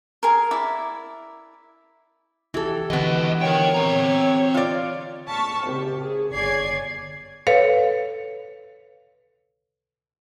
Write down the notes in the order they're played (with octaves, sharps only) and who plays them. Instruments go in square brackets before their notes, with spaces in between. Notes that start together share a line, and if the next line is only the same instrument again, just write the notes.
[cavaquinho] G#4 A#4
E4 D5 E5
[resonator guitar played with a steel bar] E3 A4 [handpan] E4 F#4 G4
[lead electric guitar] C#2 D#5 [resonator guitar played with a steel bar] B2 B3 [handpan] D3 E3
[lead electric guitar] A#4 G5 [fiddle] C#5
[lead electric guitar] C4 A#5
[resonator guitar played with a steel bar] F4 D5
[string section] A5 C#6 F6 B6
G#1 C#3 G4
G#4
G1 C#5 D5 G#5 G#6 C7
[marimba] A4 B4 C#5 F5